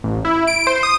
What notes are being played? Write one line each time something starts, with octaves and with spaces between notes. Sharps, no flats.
A1
E4
D7
C5
D#6